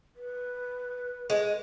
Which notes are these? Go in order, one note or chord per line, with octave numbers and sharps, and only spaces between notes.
B4
G#3